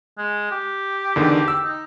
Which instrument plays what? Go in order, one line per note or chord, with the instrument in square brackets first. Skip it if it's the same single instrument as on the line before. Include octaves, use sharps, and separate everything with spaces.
[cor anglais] G#3
G4
[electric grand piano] E2 D3 D#3
E6
[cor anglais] D#4